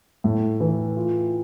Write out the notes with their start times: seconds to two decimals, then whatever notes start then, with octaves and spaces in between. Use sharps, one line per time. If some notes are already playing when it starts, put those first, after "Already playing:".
0.24 A2
0.60 E3
0.96 F4